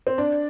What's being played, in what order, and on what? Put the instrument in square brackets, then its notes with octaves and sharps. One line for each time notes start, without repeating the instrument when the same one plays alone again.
[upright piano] C4
[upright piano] D4 [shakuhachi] D5